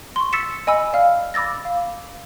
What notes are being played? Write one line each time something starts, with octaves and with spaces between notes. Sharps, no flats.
C6 C#6
E6 A6 B6 C#7 E7
D#5 G#5 B5 E6
D5 F5 F6
B5 D6 E6 A6 A#6
F5